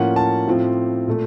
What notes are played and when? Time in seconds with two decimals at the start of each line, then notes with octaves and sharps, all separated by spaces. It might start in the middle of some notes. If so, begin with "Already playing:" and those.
Already playing: A2 F3 A#3 C#4 F4 F#5
0.16 A5
0.47 A2 F3 C4 F4
1.07 A#2 A3